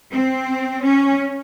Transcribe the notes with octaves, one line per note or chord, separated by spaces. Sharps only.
C4
C#4